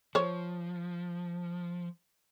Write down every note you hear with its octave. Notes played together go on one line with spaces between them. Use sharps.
F3 C5 C#5